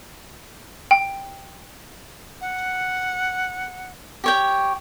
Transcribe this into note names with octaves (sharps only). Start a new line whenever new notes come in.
G5
F#5
G4 C#5 G5